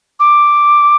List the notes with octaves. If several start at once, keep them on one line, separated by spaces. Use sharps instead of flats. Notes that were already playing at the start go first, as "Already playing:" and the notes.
D6